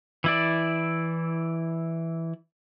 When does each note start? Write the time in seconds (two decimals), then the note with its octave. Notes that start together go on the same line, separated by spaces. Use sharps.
0.24 E3 E4 D5